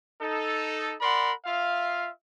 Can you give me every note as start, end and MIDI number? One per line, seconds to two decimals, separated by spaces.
0.21 0.95 63
0.21 0.95 69
1.01 1.32 70
1.01 1.32 74
1.01 1.32 78
1.01 1.32 83
1.01 1.32 84
1.45 2.10 65
1.45 2.10 76
1.45 2.10 77